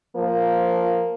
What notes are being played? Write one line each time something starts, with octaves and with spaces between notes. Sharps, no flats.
F3 A#3